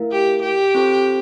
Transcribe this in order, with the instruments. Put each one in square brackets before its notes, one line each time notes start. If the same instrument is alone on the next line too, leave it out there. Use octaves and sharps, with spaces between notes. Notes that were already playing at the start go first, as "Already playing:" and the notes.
Already playing: [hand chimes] A3 E4 A#4 F5
[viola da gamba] G4
G4
[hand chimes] C4 F4 A4 C5